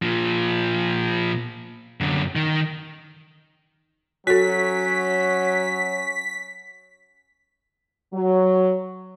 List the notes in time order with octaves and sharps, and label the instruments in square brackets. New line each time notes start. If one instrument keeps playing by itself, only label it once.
[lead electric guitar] A#2 F3
F#2 D3
D#3
[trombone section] F#3 [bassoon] C#4 [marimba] F#4 A4 [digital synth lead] B6
[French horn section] F#3